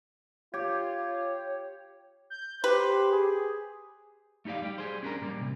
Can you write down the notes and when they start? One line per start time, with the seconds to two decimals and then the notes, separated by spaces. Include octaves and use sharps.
0.54 F4 G4 C#5
2.30 G6
2.64 G4 B4 C5
3.11 G#4
4.45 A3 D#4 G4 D5 F5
4.62 G3 G4
4.78 G3 G#4 C5
5.03 C#4 D4 A#4 A#5
5.21 A#2 G3 A#3
5.41 C3